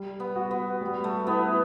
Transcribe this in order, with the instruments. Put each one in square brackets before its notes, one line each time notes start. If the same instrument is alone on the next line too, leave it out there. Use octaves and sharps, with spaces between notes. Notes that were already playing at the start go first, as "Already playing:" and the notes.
Already playing: [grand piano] G3
[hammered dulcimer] B3
[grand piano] F#4
[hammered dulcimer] B3
[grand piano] G3
[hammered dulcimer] A3
[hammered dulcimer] B3 [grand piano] E4